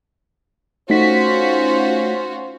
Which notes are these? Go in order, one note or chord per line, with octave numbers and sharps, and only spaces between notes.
A3 C#4 D#4 F4 F#4 C5 B6